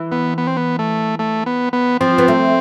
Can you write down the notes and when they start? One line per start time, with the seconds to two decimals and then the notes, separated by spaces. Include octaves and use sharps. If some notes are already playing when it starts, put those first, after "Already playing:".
Already playing: E3
0.12 B3
0.38 B3
0.47 C4
0.57 B3
0.79 A3
1.19 A3
1.46 B3
1.73 B3
2.01 F3 C4
2.18 B3
2.28 A3